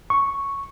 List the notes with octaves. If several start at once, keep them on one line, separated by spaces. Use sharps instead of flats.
C#6